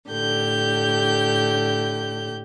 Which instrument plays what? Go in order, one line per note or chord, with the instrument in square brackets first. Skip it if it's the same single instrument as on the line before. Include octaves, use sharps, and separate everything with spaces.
[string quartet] A2 D3 G4 G6